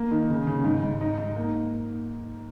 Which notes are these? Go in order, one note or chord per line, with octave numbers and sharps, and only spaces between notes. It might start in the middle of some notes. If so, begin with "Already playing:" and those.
Already playing: A#3
D#3
C#3
C#3
G#2
G#2
D#4
D#4
A#3